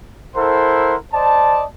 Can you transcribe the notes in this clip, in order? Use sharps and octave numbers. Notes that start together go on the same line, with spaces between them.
E4 A4 A#4 C5 F#5 C6
C5 D5 D#5 A5